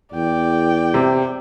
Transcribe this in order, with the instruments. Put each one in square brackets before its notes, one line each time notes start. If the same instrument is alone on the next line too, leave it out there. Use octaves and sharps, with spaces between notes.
[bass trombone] E2 [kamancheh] D5 G5
[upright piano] C3